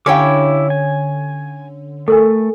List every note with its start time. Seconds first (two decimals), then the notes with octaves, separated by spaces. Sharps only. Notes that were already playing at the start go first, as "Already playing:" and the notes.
0.06 D3 C#4 E4 G4 C#5 F5 G5 D6
0.70 G#5
2.08 A3 A4 A#4 G#5